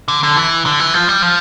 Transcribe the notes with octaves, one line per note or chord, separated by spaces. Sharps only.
D3
D3
E3
D3
E3
F3
G3
F3